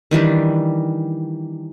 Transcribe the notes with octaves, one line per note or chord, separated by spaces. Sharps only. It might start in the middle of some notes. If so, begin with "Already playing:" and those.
D#3 E3 G3 D4